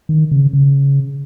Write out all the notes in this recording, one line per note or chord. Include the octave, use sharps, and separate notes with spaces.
D#3
C#3
C#3